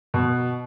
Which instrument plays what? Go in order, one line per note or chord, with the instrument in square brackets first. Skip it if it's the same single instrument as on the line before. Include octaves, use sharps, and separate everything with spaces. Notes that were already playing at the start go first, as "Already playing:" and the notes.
[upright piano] B2